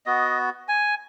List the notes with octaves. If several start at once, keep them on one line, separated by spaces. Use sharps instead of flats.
B3 F#4 D#5
G#5